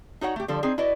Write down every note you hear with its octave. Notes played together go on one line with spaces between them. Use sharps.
D#4 F#4 C#5 F#5
A3 G4
D3 F3 G3 A4
C4 D#4 G#4
E4 F#4 B4 D5 D#5